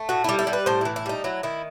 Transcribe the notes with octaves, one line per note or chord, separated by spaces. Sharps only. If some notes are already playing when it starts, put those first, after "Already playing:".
Already playing: A3
A2 F#4
G3 E4
E4
G3
B4
A2 C5
E3 E4
E4
G3 D#4
F#3 E4
D#3 E4